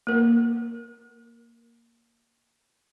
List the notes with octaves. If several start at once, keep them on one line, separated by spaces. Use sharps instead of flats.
A#3 A#4